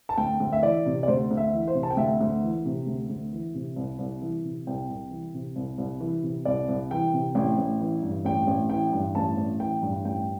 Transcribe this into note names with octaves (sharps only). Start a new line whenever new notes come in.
A5
D2 G5
D2
E5
E3 D5
C3
D5
D2 C5
D2
E5
E3
C5
C3
A5
G5
D2 E5
D2
E3
C3
D2
D2
E3
C3
C2
C2
E3
C3
C2 G5
C2
E3
C3
C2
C2
E3
C3
C2 D5
C2
E3 G5
C3
A1 G5
A1
E3
G2
A1 G5
A1
E3 G5
G2
A1 A5
A1
E3 G5
G2
A1 G5